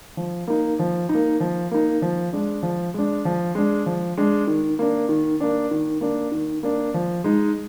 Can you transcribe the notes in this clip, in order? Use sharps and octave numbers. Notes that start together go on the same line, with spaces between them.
F3
A#3 D#4
F3
D#4
A#3
F3
A#3 D#4
F3
G#3 D4
F3
G#3 D4
F3
G#3 D4
F3
G#3 D4
D#3
A#3 D4
D#3
A#3 D4
D#3
A#3 D4
D#3
A#3 D4
F3
G#3 D#4